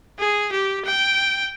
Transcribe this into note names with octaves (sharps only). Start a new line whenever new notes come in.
G#4
G4
G5